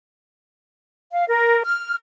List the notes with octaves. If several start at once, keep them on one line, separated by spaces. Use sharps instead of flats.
F5
A#4
F6